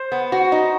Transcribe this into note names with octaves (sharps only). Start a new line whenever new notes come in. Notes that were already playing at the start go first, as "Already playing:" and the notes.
Already playing: C5
B3
F#4
D#4